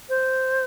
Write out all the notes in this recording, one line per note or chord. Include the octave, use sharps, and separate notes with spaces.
C5